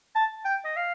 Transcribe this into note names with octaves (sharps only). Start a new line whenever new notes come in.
A5
G5
D#5
F5